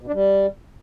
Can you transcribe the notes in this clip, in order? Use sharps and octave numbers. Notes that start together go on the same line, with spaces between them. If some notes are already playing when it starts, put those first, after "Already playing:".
B2
D4
G3